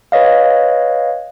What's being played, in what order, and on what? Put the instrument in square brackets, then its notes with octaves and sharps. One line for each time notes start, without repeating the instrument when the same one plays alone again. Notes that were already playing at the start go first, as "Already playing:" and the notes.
[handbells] B4 C#5 D#5 F5